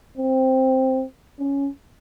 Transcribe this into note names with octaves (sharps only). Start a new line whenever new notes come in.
C4
C#4